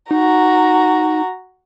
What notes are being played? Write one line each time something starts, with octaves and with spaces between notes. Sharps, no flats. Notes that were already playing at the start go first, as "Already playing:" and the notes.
D#4 F#4 A#5